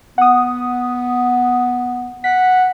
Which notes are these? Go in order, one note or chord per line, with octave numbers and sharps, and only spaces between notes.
B3 F#5 D#6
F#5 B6